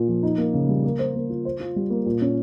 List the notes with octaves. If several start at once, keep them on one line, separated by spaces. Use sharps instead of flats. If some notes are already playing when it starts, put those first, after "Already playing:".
Already playing: A#2
F3
D#4
A#3
C#3
G3
A#3
C5
A#3
F4
C5
F4
G3
A#3
A#2
C#4